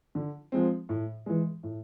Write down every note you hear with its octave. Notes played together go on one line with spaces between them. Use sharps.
D3
F3 G#3 C4
A2
E3 G#3
A2